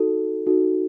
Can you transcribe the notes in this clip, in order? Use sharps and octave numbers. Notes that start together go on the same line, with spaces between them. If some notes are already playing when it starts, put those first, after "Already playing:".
Already playing: D#4 F#4 A4
D#4 F#4 A4